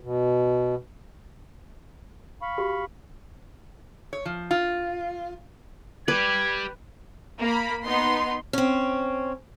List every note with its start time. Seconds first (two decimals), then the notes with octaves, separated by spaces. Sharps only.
0.01 B2
2.42 F5 B5 C#6
2.58 F#4 G4
4.13 C#5
4.25 F3
4.51 F4
6.08 G4 B4 D5 G#6
7.41 A#3 B5
7.85 B3 D#4 C6
8.53 C4 C#4